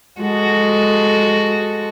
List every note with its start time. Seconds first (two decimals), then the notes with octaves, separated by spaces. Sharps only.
0.20 G#3 F#4 A4